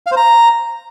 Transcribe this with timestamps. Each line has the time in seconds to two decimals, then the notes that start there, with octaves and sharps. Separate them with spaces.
0.06 F5
0.12 C5
0.17 A#5